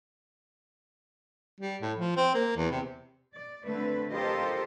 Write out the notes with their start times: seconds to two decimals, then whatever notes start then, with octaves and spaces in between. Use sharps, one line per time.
1.60 G3
1.82 A2
1.98 F3
2.17 C4
2.34 A#3
2.56 E2
2.71 C3
3.31 D5
3.64 D3 A3 C4 B4
4.11 F4 G4 A4 A#4 C5 D#5